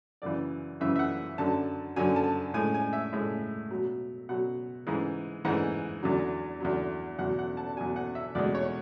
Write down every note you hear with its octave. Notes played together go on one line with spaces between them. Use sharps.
F#2 C#3 E3 D5
F#2 C#3 E3 E5
E5
F#5
F#2 D3 F#3 A5
F#2 D3 F#3 G#5
A5
A2 G#3 G#5
G#5
E5
A2 G#3
B2 F#3
B2 F#3 F#5
G#2 E3 G#3
G#2 E3 G#3 F#5
E2 D3 F#3
E2 D3 F#3
E2 B2 F#3 F#5
F#5
A5
E2 B2 F#3 G#5
F#5
E5
E2 B2 G#3 D5
C#5